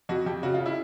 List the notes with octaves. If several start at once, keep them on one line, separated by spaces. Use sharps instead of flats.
F2 F#4
F2 G4
C#3 F#4
F4
C#3
E4